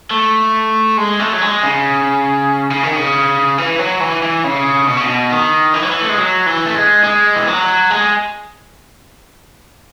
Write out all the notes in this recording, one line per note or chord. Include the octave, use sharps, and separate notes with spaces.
A3
G#3
A3
F#3
G#3
C#3
C#3
D#3
C#3
E3
F#3
E3
E3
C#3
B2
C#3
B2
D#3
E3
F#3
E3
A3
G#3
F#3
E3
A3
G#3
G#3
E3
F#3
G#3